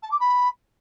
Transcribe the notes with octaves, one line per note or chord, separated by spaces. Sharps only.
A5
D6
B5